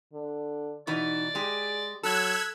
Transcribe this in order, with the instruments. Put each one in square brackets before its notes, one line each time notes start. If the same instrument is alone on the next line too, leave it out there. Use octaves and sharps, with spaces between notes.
[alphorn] D3
[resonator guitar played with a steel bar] B2 E3 [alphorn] D#4 [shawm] D5
[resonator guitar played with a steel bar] G#3 G4 [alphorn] G#4
[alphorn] F#3 [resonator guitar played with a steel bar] A4 [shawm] B5 [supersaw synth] E6 F#6 G#6